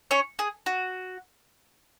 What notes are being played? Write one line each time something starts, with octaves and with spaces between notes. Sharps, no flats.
C#4 C#5
G#4
F#4